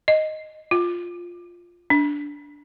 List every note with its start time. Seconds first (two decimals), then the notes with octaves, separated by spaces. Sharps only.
0.08 D#5
0.71 F4
1.90 D4